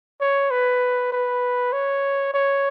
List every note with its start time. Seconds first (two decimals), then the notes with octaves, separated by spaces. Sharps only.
0.21 C#5
0.51 B4
1.12 B4
1.72 C#5
2.34 C#5